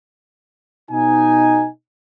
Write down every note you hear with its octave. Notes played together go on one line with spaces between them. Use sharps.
B2 D#4 G#5